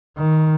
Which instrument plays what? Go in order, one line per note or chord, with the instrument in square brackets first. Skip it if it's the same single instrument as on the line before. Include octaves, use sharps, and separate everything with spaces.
[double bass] D#3